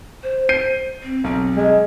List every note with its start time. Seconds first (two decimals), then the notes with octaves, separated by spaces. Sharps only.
0.23 C5
0.49 G6 C7 D#7
1.02 C4
1.24 B1 C4
1.56 G#3